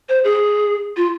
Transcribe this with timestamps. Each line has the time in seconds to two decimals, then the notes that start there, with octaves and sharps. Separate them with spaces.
0.09 C5
0.24 G#4
0.97 F4